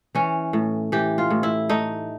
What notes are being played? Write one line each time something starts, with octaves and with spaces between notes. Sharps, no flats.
E3 C#4
A2
E3 G4
F4
A2
E4
A3 D#4